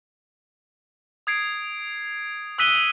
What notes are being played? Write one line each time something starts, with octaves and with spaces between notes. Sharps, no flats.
D#6 G#6 C7 D7
D#6 E6 F#6 B6 D#7 G7